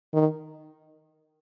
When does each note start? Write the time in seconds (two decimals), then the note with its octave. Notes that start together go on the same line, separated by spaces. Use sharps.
0.13 D#3